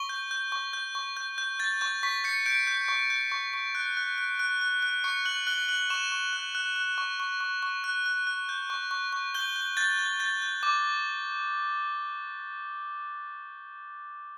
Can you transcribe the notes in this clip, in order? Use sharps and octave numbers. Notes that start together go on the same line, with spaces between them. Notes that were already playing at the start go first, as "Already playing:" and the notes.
Already playing: C#6 G7
G6
G6
C#6
G6
C#6
G6
G6
G6 A6
C#6 G6
C#6 B6
G6 C#7
G6 D7
G6
C#6
G6
C#6
C#6
F#6
F#6
F#6
F#6
F#6
F#6
C#6 C#7
F#6 F#7
F#6 G7
F#6 F#7
C#6 E7
C#6
F#6
F#6
F#6
C#6
C#6
C#6
C#6
F#6
F#6
F#6
G6
C#6
C#6
C#6
G6 G7
G6
G6 A6
G6
G6 A6
G6
D6